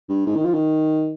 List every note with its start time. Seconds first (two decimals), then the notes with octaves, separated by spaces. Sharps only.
0.09 G2
0.26 G#2
0.36 D#3
0.45 F3
0.54 D#3